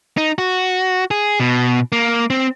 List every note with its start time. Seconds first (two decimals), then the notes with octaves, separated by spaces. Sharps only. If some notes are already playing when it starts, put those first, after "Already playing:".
0.17 D#4
0.38 F#4
1.11 G#4
1.40 B2
1.92 A#3
2.30 C4